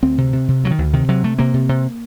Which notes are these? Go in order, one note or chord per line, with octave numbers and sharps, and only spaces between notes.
D2 C4
C3
C3
C3
D2 F#3
D#3
D2
C3 D#3
C3 F#3
C3 A3
C3 A#3
C3
C3